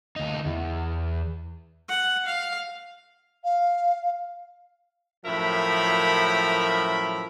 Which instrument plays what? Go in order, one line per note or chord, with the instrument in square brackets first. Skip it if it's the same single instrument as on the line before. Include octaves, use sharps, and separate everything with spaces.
[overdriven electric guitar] D2 D#4
E2
[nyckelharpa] F#5
F5
[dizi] F5
[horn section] F#2 A2 F3 A#4 E5 B5